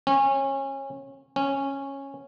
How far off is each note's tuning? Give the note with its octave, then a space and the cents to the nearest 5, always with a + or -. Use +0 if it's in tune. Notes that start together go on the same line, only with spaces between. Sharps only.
C#4 -25
C#4 -10